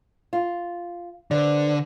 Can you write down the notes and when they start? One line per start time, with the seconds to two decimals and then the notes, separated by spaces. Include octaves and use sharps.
0.33 F4
1.31 D3 B4 C5 D5